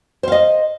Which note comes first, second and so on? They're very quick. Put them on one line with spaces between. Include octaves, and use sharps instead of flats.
C5 F5 D#5